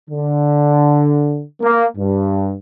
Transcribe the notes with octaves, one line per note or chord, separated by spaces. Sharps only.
D3
A#3
G2